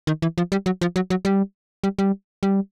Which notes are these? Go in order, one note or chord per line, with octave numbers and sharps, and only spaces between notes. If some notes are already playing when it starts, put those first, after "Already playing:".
D#3
E3
F3
G3
F#3
F3
F#3
F#3
G3
G3
G3
G3